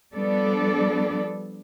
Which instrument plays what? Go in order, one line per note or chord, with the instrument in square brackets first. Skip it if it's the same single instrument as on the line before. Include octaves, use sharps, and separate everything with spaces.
[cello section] F3 G3 B3 D4 A4 D5